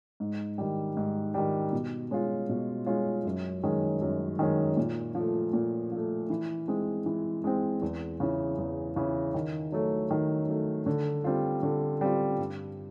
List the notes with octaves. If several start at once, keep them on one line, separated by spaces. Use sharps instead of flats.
G#2
D#3 G3
G#2
D#3 G3
B2
G#3 C#4 F4
B2
G#3 C#4 F4
F#2
D#3 G#3 C#4
F#2
D#3 G#3 C#4
A#2
F3
A3
A#2
F3 A3
E3
G#3 C4
E3
G#3 C4
E2
C#3 E3
E2
C#3 E3
D#3
F#3 A3
D#3
F#3 A3
D3
G3 C4 F4
D3
G3 C4 F4
G2